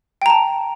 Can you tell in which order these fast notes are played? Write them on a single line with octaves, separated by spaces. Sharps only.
G5 A#5 A5